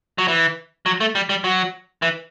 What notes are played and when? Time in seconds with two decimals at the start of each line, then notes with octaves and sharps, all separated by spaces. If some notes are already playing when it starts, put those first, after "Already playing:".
0.18 F#3
0.28 E3
0.86 F#3
1.00 A3
1.15 G3
1.29 G3
1.44 F#3
2.02 E3